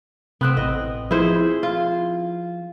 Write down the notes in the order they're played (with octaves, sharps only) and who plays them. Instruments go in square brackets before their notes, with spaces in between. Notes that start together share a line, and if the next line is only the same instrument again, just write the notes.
[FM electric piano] C3 F#6 [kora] B3 C4
[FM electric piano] A1 [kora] D#5
[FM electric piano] F3 [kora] E4 G#4 C5
[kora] F4